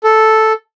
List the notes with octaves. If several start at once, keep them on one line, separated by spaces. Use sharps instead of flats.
A4